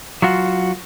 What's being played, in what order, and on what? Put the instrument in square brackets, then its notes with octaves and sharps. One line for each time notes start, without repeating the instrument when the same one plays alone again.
[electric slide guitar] F#3 F4 F#4